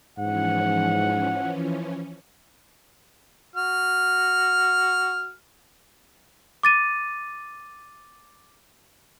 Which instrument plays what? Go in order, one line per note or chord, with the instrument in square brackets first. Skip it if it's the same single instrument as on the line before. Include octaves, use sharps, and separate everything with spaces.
[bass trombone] G#2 [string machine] E3 F3 C#4 [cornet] F#5
[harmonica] F#4 F6
[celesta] D6 A6 D#7